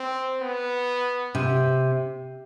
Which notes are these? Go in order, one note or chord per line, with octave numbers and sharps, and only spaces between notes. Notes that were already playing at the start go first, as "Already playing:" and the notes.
Already playing: C4
B3
C3